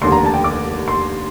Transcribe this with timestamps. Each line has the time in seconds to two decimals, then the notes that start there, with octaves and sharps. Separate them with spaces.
0.01 F1 D#2 D3 C6
0.12 A#5
0.26 A5
0.34 G5
0.44 D6
0.88 C6